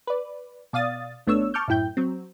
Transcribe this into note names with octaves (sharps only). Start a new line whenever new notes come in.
B4 D5
B2 D5 F5 D#6 A6
G#1 A3 B3 D4 C#5 E6
A5 C#6 D6 F6 G6
F#2 A2 E4 G5 G6
F#3 C4